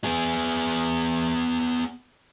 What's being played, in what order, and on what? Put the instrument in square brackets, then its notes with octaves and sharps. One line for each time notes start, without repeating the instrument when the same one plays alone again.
[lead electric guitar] B3 G#4